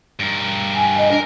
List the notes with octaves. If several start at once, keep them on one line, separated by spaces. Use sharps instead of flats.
G2 A#4
G#5
D#5
D4 A#4